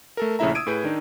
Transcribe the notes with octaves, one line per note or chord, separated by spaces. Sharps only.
A3 A4 A#4
A#1 C#3 A3 E4 E5 A#5
D#6 E6 G#6 D7 D#7
A2 G#4 B4 G6
D#3 D4 D#4